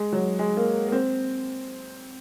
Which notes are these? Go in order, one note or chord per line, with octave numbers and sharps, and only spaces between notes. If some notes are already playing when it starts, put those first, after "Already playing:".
Already playing: G#3
F#3
G#3
A#3
A#3
C4